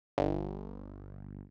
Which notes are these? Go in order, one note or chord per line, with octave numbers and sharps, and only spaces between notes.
G1